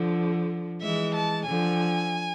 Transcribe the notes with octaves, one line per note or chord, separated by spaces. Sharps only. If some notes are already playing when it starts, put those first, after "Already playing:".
Already playing: D3 F3
E3 G#3 E5
A5
D3 F3 G#5